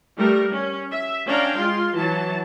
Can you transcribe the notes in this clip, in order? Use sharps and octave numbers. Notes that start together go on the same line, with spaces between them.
G3 A3 A#4
C#4
E5
C#4 D4 F5 G5 A#5
G#3 F4 C6
E3 F#3 A5